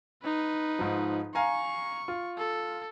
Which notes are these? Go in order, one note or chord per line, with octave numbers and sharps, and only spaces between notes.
D#4 B4
G#2 F3
F5 G#5 A#5 C#6
F4
A4